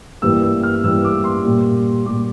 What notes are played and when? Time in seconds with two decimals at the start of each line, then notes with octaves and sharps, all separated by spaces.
0.22 G2 E3 G3 A#3 E6
0.43 E6
0.63 F6
0.84 G2 E3 G3 A#3 E6
1.04 D6
1.24 C6
1.45 A#2 G3 A#3
2.05 A#2 G3 A#3 D6